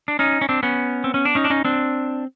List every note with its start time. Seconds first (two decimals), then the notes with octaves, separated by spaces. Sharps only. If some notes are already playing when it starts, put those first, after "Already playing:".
0.08 D4
0.19 C#4 D#4
0.41 C#4
0.49 C4 D4
0.63 B3 C#4
1.04 C4
1.14 C#4
1.25 D4
1.35 C#4 D#4
1.44 D4
1.50 C#4 D#4
1.65 C4 D4